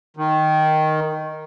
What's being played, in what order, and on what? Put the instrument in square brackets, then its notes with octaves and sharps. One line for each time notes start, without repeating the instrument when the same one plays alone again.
[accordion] D#3